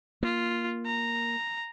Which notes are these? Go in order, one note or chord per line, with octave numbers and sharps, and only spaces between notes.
A#3 F4
A#5